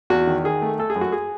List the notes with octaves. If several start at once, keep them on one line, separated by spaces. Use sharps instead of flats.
E2 F#4
D#3
D#3 G#4
A3
A3 A4
G#4
F#2
F#4
G#4